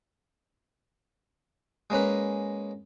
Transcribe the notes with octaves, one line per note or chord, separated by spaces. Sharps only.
G#3 A#3 C#4 B4